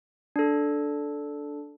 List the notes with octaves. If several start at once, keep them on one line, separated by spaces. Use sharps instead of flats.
D4 A4